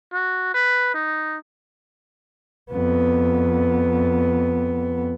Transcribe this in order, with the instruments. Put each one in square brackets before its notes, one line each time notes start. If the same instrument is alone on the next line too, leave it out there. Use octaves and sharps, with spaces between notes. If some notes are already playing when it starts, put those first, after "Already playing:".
[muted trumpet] F#4
B4
D#4
[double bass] F2 B3